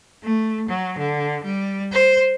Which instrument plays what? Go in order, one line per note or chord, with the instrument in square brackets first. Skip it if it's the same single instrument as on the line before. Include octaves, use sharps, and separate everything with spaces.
[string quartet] A3
F#3
D3
G3
C5